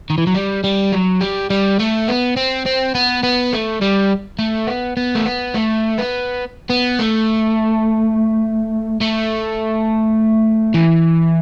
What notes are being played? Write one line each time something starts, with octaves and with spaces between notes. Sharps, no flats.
D#3
E3
F#3
G3
G3
F#3
G3
G3
A3
B3
C4
C4
B3
B3
A3
G3
A3
B3
B3
A3
B3
A3
B3
B3
A3
A3
E3